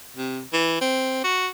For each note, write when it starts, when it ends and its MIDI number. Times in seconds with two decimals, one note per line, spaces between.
0.17 0.40 48
0.53 0.77 52
0.81 1.20 60
1.24 1.48 66